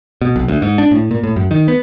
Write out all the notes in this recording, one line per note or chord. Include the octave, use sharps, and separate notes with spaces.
B2
B1
D2
G#2
D4
A2
A#2
A2
F#2
D#3
B3